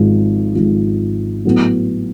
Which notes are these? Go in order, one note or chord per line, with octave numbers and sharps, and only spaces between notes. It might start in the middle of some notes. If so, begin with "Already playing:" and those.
Already playing: G#1 G#2 F3
G#1 G#2 F3
A2 F#3 B3